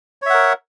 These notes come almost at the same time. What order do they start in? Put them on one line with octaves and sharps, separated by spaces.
C#5 E5 F#5 A#4